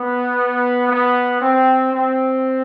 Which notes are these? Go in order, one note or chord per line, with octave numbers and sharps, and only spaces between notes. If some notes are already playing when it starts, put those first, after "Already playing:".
Already playing: B3
B3
C4
C4